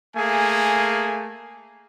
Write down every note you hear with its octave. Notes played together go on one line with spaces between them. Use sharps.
A3 A#3 G#4 G#5